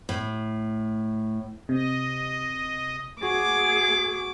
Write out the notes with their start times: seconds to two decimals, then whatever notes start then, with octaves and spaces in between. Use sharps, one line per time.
0.09 A2
1.69 C3 D#5
3.22 F#4 G#4 D6